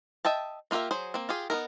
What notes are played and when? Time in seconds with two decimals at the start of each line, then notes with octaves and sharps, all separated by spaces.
0.25 D#5 E5 G5 A5
0.71 A#3 F4 G4 A#4 E5
0.91 F#3 G#4 C5
1.14 A#3 C4
1.29 F4 G4 G#4
1.50 B3 D#4 E4 A#4